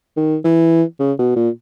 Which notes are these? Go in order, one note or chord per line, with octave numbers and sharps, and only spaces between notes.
D#3
E3
C#3
B2
A#2